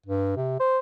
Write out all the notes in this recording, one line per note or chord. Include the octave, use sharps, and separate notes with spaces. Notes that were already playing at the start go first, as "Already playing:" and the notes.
G2
C3
C5